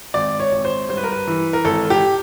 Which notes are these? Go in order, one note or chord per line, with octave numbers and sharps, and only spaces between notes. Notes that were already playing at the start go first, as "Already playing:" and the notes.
G#1 D5
C#5
G#1
C5
G2 C5
B4
A#4
B4
E3
A#4
G#1 A4
G4